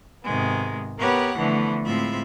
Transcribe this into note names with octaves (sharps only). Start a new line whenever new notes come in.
G#2 C3 D#3 G#3 B3
B3 G4 A#4 B4 C#5 F#5
D3 E3 F3 A3 B3
A2 G#3 C4 F4 E5 B5